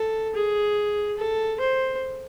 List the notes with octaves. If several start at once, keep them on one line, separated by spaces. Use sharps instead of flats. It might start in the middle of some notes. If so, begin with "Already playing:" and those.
Already playing: A4
G#4
A4
C5